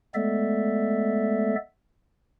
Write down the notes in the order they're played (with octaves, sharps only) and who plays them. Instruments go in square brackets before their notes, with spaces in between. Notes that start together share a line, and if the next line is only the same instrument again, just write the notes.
[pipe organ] G#3 A3 B3 A4 D5 E5